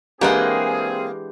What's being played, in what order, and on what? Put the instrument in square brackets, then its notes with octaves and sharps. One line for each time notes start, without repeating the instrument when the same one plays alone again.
[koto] E3 G#3 F#5 [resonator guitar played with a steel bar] A#3 [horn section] C4 G#4 [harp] D4 G4